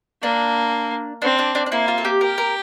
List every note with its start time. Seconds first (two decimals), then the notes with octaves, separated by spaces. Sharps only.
0.23 A#3 D4
1.22 C4 D4
1.39 D4
1.55 D4
1.66 D4
1.72 A#3 E4
1.88 F4
1.98 A4
2.05 G4
2.21 G4 A#4
2.38 A#4